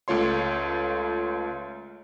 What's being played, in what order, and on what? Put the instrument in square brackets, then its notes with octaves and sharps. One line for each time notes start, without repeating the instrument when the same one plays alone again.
[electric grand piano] C#2 A3 F4 C#5 C6